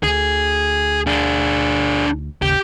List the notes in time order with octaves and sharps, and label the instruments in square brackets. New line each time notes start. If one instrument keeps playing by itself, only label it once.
[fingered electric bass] D2 D3 [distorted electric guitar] G#4
[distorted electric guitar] D4 G#4
[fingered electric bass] G#1 D#2 C#3 [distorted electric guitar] G4